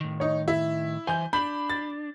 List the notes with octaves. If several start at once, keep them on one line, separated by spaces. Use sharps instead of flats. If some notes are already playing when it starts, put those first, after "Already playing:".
A2 D#3
D#4 C#5
E4 E5
E3 C5 G#5 G6
D4 B5 G6 F#7
A6